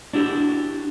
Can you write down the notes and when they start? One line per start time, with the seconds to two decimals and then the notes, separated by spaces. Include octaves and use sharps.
0.13 D4 E4 F#4 G4